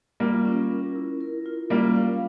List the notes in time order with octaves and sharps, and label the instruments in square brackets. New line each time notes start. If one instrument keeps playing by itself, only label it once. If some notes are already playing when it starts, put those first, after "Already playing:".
[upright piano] G3 A#3 [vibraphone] F4
[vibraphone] C#4
A#4
E4
A#4
F4
[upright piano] G3 A#3 [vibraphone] C#4
[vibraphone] F5